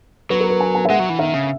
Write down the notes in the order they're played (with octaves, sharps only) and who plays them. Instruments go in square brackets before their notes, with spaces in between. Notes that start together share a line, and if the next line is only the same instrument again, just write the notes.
[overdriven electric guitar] F#3 [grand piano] B4
[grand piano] A#4
B4
G#5
G#5
E5
[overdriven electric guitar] G#3 [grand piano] F#5
[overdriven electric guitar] F#3
E3
[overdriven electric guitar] D#3 [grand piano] E5
[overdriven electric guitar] C#3